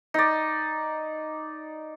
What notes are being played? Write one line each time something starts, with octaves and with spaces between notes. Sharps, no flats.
D#4 D5